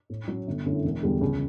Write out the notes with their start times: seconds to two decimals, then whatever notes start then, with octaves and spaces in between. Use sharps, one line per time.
0.10 A2
0.28 F#3 C#4
0.47 G1
0.65 F#2 D3 A3 E4
0.84 E1
1.03 E2 D3 G3
1.21 C#2